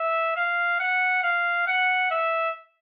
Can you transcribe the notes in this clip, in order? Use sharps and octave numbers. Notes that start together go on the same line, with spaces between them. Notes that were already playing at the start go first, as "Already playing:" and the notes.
Already playing: E5
F5
F#5
F5
F#5
E5